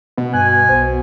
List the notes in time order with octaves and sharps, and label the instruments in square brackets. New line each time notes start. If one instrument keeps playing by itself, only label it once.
[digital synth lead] B2
[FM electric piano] G2 F#6 [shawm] G#5
[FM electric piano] B1 C5